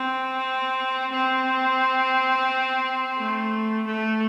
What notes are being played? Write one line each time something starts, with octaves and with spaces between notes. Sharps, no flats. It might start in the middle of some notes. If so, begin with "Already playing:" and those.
Already playing: C4
C4
A3
A3